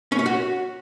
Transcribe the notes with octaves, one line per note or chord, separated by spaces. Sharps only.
C#4
C#5
F#4